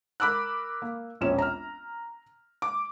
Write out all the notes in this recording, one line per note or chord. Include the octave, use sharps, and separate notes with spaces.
A#4 B5 D6 E6 F#6
A#3
E1 A#1 C4 C#4 E7
A#5 F6
D6